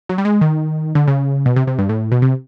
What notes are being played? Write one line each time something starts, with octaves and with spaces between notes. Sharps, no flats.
F#3
G3
G#3
D#3
D3
C#3
B2
C3
C3
G2
A2
B2
C3